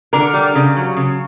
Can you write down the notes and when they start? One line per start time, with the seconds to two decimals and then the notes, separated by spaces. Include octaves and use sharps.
0.13 D3 A#4
0.33 G3
0.55 C#3
0.76 F#3
0.97 C#3